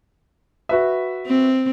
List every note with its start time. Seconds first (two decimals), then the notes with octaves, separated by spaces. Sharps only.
0.69 F#4 B4 E5
1.27 C4